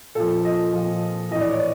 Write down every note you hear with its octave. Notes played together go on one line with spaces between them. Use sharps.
A#2 F3 A4
D#5
A#2 F3
A2 E3 D#5
D5
C#5
D5